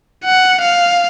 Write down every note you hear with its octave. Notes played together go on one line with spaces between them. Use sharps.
F#5
F5